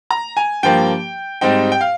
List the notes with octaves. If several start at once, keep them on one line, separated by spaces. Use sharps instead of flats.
A#5
G#5
G2 F3 A#3 G5
G#2 G3 C4 D#4 G5
G5
F5